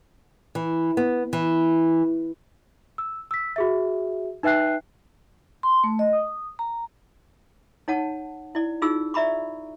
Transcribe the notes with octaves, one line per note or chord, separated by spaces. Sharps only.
E3
B3
E3
E6
E6 B6
F#4 G#4 E5
D#4 B4 E5 G5 F#6 C7
C6
A3
D#5
D#6
A#5
D#4 C#5 F#5 A5
E4 D5
D#4 F4 G#4 E6
D5 E5 A#5 B5 C#6